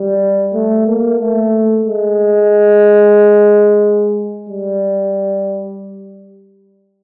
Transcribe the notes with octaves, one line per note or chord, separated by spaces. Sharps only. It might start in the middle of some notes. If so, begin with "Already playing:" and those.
Already playing: G3
A3
A#3
A3
G#3
G3